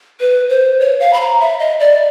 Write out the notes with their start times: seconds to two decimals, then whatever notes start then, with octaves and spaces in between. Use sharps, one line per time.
0.20 B4
0.49 C5
0.80 C#5
1.00 F5
1.13 B5
1.20 A#5
1.40 E5
1.59 D#5
1.80 D5